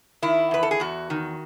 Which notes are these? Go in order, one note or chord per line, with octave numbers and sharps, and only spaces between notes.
D#3 E4
E2 B4
A4
G#4
E2 F#4
D#3